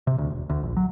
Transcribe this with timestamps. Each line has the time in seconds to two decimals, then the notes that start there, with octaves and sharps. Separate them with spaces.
0.07 C3
0.18 D2
0.30 E1
0.50 D2
0.63 A#1
0.77 F#3